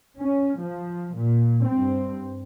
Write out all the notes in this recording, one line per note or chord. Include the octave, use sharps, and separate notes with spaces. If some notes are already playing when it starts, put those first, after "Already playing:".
C#4
F3
A#2
G2 C4